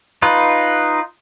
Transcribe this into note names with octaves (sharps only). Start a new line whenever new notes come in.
D#4 F4 B4